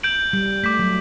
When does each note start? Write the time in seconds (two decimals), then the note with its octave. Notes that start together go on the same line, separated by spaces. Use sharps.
0.03 G6 D7 F#7
0.33 G3
0.63 A3 D6 G6 B6
0.79 F#3